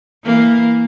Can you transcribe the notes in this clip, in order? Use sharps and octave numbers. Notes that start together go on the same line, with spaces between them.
E3 A#3